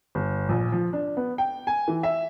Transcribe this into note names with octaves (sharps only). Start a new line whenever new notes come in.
G1
A#1
F3
D4
B3
G5
G#5
E3
E5